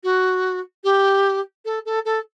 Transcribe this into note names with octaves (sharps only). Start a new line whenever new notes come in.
F#4
G4
A4
A4
A4